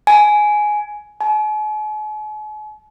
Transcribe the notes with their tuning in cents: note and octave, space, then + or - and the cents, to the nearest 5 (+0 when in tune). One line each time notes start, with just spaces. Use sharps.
G#5 +10
G#5 +45